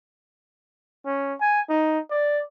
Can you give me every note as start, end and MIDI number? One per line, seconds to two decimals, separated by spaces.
1.06 1.35 61
1.41 1.61 80
1.70 1.99 63
2.11 2.42 74